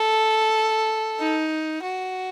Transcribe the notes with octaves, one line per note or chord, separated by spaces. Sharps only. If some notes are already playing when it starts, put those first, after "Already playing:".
Already playing: A4
D#4
F#4